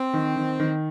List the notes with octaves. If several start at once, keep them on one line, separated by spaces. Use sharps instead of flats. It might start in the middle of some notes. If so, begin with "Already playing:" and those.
Already playing: C4
D#3
D#3
D#3